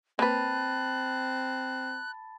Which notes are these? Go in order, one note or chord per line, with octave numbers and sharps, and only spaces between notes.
A#3 C4 B4 A5 B5 F#6 A6